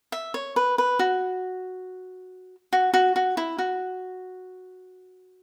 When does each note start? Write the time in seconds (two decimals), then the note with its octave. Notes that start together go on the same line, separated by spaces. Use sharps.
0.12 E5
0.34 C#5
0.56 B4
0.78 B4
0.99 F#4
2.73 F#4
2.94 F#4
3.16 F#4
3.37 E4
3.58 F#4